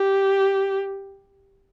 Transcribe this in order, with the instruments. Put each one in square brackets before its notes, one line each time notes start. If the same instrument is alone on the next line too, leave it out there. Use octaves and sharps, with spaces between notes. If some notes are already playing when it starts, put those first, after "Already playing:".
Already playing: [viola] G4